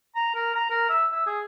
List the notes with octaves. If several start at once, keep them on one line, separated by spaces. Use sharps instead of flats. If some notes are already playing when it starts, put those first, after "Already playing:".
A#5
A#4
A#5
A#4
E5
E5
G#4